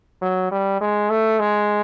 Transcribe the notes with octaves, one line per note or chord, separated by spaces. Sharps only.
F#3
G3
G#3
A3
G#3